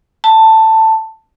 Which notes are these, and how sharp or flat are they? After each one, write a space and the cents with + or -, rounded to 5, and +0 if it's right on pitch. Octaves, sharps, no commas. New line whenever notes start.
A5 +10